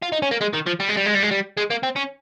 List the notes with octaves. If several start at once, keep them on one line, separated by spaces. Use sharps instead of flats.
F4
D#4
C#4
A#3
G#3
D#3
F3
G3
G#3
G3
G#3
G3
G#3
G3
G#3
A#3
C4
C#4